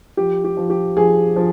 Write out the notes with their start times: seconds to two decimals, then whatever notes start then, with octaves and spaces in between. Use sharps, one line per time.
0.17 F3 G4
0.44 G4
0.57 F3
0.70 G4
0.97 F3 G#4
1.36 F3